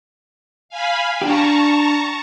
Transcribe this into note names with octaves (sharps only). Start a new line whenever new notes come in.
F5 G#5 B5
D4 G4 A5 A#5 C#6